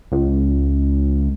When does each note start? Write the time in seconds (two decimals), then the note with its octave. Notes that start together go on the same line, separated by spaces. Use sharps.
0.12 C#2